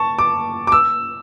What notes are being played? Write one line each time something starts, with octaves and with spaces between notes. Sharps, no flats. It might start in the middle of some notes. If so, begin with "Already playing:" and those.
Already playing: A5 C#6
D6
D6
E6